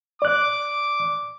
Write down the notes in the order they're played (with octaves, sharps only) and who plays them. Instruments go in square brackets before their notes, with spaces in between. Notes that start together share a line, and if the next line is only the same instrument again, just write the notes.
[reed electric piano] D5 F#6 [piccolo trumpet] D6